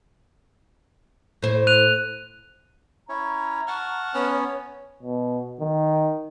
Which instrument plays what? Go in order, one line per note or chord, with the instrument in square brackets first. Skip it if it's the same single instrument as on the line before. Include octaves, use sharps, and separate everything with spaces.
[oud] A2 C5
[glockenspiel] F#6 D#7 F7
[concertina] C#4 E4 C#5 [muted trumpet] A#5
[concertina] F#5 A5 F6 [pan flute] C#6
[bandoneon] B3 C#4 [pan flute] C#5
[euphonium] B2
D#3